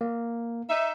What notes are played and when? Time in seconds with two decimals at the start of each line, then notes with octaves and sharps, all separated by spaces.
0.01 A#3
0.68 D#4 E5